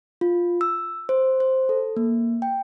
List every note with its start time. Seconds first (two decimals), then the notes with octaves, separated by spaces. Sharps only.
0.21 F4
0.61 E6
1.09 C5
1.40 C5
1.69 A4
1.97 A#3
2.42 G5